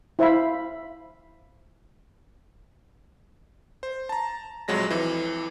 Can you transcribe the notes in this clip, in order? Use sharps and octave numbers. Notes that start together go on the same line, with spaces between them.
E4 C5 E5 F5 B5
C5
A5 A#5
A#1 F2 F#3 G#3 A#6
F2 E3